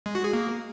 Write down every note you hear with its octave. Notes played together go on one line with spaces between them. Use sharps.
G#3
F#4
G#4
A#3